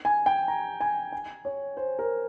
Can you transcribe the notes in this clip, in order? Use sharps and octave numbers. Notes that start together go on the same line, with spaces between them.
G#5
G5
A#5
G#5
G#5
C#5
C5
A#4